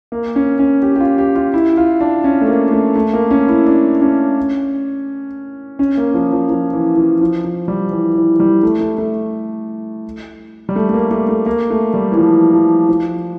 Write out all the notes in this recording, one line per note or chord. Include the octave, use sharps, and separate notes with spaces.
A#3
C#4
C#4
G4
G4
F4
G4
F4
E4
F4
D4
C#4
A3
A#3
A3
A3
A#3
C#4
E4
D4
C#4
C#4
A#3
F3
F3
F3
E3
F3
F3
F3
G3
E3
E3
G3
A3
A3
A3
G3
A3
A3
A#3
A3
A3
A#3
A3
G3
E3
F3
F3
F3